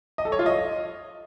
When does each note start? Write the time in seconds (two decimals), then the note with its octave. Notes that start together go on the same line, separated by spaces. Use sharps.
0.18 D#5
0.25 A4
0.32 C#5
0.39 F4
0.46 D#5